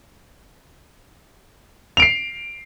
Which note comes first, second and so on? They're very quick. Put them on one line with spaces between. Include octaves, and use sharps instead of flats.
F7 D7 C7